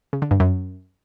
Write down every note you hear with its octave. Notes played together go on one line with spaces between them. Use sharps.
C#3
D3
G2
F#2